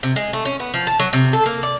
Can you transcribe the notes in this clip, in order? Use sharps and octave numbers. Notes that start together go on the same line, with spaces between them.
C3
G#3
A3
C#4
B3
F3
A5
F#3
C3
A4
A#3
D5